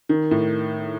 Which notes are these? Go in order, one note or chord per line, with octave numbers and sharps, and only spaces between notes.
D#3
A2